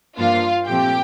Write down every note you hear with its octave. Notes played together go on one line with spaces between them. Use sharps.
G2 F3 A#3 D4 F4 F5
A#2 F3 A3 C4 G4 G5